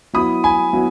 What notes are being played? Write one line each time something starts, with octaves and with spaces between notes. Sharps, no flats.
F#3 B3 E4 B5 D#6
G#5 B5
F#3 B3 E4